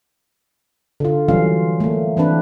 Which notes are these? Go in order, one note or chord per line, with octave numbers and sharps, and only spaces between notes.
D3 F4
E3 F#3 G3 C#4 F4 F5
A3 A#3
E3 C4 D4 B4